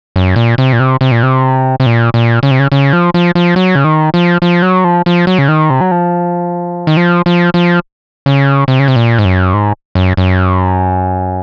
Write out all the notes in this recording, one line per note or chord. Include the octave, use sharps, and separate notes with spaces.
F#2
A#2
C3
A#2
C3
C3
A#2
C3
C3
A#2
A#2
C#3
C3
C#3
C#3
F3
F3
F3
F#3
C#3
D#3
F3
F3
F#3
F3
F3
F#3
C#3
D#3
C3
F#3
F3
D#3
F3
F3
F3
C#3
C3
C#3
C3
A#2
G#2
F#2
G#2
F#2
F#2